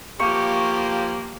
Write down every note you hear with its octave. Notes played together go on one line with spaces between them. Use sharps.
F3 A#3 G4 C#6